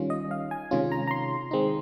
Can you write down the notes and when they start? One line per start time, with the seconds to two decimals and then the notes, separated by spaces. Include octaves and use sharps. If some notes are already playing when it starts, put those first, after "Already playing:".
Already playing: D#3 G3 C#4 F4
0.10 D#5
0.31 F5
0.51 G#5
0.71 C3 D#3 G#3 C#4 F4
0.92 A#5
1.07 A#5
1.11 C6
1.51 D#3 G#3 C4 D#4